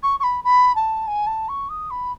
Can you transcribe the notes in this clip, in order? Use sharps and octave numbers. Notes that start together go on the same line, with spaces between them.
C#6
C#6
B5
B5
A5
G#5
A5
C#6
D#6
B5